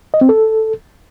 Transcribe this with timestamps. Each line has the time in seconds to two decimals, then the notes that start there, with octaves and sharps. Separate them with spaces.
0.14 D#5
0.21 C4
0.29 A4